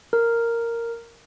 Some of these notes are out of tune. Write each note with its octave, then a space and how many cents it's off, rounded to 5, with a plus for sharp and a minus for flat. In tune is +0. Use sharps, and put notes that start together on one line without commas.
A#4 -5